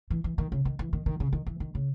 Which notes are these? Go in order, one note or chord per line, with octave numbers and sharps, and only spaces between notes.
E3
E3
D#3
C#3
D#3
E3
D#3
D#3
C#3
D#3
E3
D#3
C#3